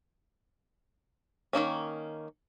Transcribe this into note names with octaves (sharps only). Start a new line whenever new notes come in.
D#3 E3 A#3 C#4